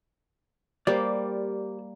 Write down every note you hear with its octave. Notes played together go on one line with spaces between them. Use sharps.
G3 A#3 G4 C5 D5